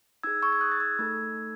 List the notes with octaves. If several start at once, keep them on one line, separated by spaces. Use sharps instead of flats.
D#4 G#4 E6 G#6
C#6 E6
G#6
D#6 F#6
A6
E6 G#6
A3 D#4 A4 E6 G#6